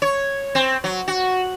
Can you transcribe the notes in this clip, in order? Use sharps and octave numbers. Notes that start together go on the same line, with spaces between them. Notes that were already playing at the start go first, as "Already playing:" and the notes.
C#5
C4
F#3
F#4